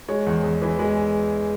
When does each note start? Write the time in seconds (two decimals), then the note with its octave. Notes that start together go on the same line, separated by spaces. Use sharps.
0.08 G#3 C#5
0.27 E2
0.44 E2
0.62 E3
0.79 G#3